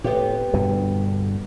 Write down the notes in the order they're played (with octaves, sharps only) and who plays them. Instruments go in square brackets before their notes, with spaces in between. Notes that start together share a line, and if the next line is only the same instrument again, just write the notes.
[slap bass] A2 [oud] B3 C4 G4
[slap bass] G2 B2 D3